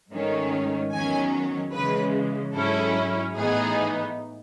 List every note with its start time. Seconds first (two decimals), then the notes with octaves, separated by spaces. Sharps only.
0.12 G#2 D#3 A3 C#4
0.92 E2 D#3 F#3 C#4 G#5
1.74 C#3 E3 G#3 B4
2.54 G#2 F#3 C#4 E4 A4
3.35 A2 E3 B3 D#4 G#4